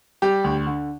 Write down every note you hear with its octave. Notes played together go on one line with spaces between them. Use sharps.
G3 G4
D2
D3